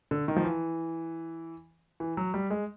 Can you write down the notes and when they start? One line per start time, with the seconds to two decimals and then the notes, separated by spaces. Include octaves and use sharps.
0.11 D3
0.28 D#3
0.36 F3
0.45 E3
2.00 E3
2.17 F#3
2.34 G3
2.50 G#3